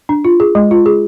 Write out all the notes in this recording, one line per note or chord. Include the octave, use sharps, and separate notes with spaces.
D4
F4
G#4
G#3
F4
G#4